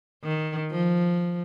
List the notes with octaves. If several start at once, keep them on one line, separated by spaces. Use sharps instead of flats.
D#3
F3